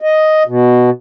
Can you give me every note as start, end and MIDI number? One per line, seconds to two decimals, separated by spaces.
0.01 0.43 75
0.47 0.90 47